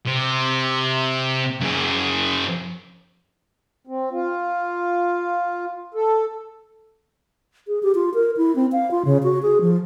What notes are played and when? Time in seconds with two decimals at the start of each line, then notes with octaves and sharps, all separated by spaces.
0.07 C3
1.61 F#2 G#4
3.87 C4
4.12 F4
5.94 A4
7.68 G#4
7.83 G4
7.95 F4
8.14 A#4
8.37 E4
8.56 C4
8.72 F5
8.91 F4
9.05 C#3
9.23 F#4
9.42 G#4
9.61 F3